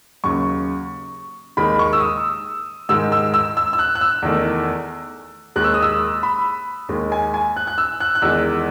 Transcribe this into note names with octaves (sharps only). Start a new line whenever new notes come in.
D#2 C#3 F#3 C#6
D#2 D#3 G#3 B5
C#6
E6
D#6
G#2 D#3 G#3 E6
E6
E6
E6
E6
F#6
F#6
E6
E2 D#3 A3
D#2 D#3 G#3 F#6
E6
D#6
E6
B5
D#2 D#3 G#3
G#5
G#5
F#6
F#6
E6
F#6
F#6
E2 D#3 G#3 E6